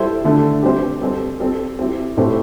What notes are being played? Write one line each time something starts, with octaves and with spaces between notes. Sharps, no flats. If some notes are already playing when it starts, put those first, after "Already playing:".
Already playing: G3 E4 A4 C5
D3 A3 D4
G3 C4 G4 C5
G3 C4 A4 C5
G3 C4 A4
G3 C4 E4 G4
A2 A3 C4 G4 C5